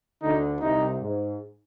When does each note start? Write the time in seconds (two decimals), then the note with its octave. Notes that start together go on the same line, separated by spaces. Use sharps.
0.22 D2 D3 D#4
0.61 C2 C3 D#4
1.00 G#2